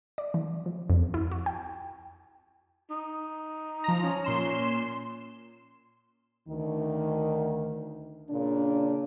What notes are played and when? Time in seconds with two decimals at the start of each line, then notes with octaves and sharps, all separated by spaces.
0.18 D5
0.34 E3
0.66 F3
0.90 F2
1.14 E4
1.31 F#4
1.46 G5
2.90 D#4
3.84 F3 A#5
4.03 C#4
4.24 A#2 C6 E7
6.48 D2 D#3
8.30 A#2 C#3 C#4 D4